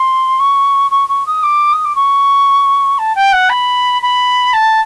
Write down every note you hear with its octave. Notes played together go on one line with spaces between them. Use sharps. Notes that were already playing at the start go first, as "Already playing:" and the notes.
Already playing: C6
C#6
C#6
C#6
D#6
D6
D#6
D6
C#6
A5
G5
F#5
B5
B5
A5